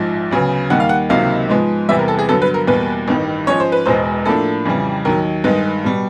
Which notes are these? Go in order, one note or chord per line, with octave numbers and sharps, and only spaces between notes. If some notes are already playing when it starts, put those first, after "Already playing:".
Already playing: A#1 G#2 F3
D2 C#3 F#3 B3
D#2 D#3 G3 A#3 F#5
F5
F#5
C#2 C3 D#3 F#3 A#3 F5
G#2 F3 G#3 B3
E2 C3 E3 G3 B3 E5
A#4
A4
G#4
G2 D3 F#3 B3 A4
B4
A#4
E2 B2 G3 A#3 B4
A1 G2 D#3 G3
G#2 F3 G#3 C#4 C#5
C5
B4
E1 E2 B2 G#3 B3 C5
A2 F3 A#3 D4 A4
F2 C#3 E3 G3
D#2 D#3 F#3 A#4
G2 D#3 G#3 B4
B2 G3